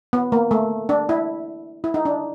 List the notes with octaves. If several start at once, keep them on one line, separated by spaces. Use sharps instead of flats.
B3
A#3
A3
D4
E4
E4
D#4
D4